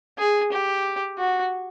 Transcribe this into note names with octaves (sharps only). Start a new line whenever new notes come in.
G#4
G4
F#4